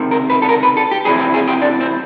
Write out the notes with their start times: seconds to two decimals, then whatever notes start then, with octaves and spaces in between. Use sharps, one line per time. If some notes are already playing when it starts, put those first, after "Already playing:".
Already playing: C#2 C3 D#3
0.11 A#4
0.30 B4
0.42 A4
0.49 A#4
0.63 B4
0.77 A4
0.91 G4
1.05 F2 C3 E3 G#4
1.19 G4
1.34 G#4
1.48 G4
1.62 D4
1.81 C4